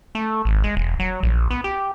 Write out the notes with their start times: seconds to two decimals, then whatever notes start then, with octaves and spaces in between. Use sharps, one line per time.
0.15 A3
0.45 G#1
0.64 G#3
0.77 E1
1.00 F#3
1.23 A#1
1.51 B3
1.64 G4